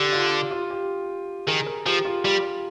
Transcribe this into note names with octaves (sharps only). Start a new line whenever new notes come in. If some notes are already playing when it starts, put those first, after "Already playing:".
Already playing: D3 G4
F4
F4
G4
D#3 G#4
A#4
F3 G4
F4
G3 G4